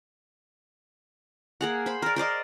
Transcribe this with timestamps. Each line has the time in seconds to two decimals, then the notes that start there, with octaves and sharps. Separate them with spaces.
1.61 A#3 G#4 F#5
1.86 C5 B5
2.02 A#4 D5
2.16 A#4 C5 D5 D#5